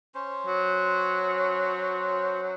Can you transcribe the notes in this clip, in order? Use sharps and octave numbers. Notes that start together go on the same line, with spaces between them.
C#4 C5
F#3